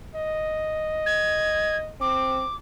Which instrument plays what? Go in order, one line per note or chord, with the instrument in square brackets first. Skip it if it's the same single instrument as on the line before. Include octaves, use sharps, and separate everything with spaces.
[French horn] D#5
[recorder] G#6
[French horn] C4 [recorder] D6